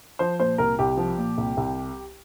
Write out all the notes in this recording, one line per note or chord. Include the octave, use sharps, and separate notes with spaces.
F3 C5
A#2 C5
C2 A#4
C2 G4
F3
A#2
C2
C2